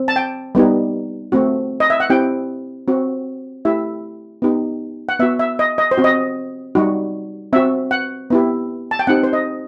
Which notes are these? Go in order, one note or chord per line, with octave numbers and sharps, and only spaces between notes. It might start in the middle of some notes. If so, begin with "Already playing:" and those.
Already playing: C4
A5
G5
G3 B3 D#4 G4
A3 C4 F#4
D#5
E5
F#5
C4 E4 G4 G5
C4 F#4
A3 E4 G4 E5
B3 D#4 G4
F#5
B3 F#4 E5
E5
D#5
D#5
C5
C4 F#4
D#5
G3 D#4 F#4
C4 F#4 E5
F#5
B3 E4 G4
A5
G5
C4 D#4 G4 F#5
C5
D#5